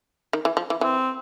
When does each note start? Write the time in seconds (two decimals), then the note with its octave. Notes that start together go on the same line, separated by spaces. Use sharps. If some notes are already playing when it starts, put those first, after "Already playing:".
0.33 D#3
0.45 E3
0.57 F3
0.70 E3
0.81 E3 C4